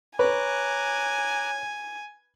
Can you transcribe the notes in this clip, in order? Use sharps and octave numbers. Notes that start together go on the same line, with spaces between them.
B4 C#5 G#5 A#5 D6 F#6